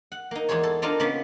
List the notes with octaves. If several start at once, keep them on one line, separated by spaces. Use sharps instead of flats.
F#5
A#3 D#4
E2 G#3 G#4 C5 C#5
A4
C4 D4 D#4 F4 A4 A#4
C#3 A#3 B3 C#4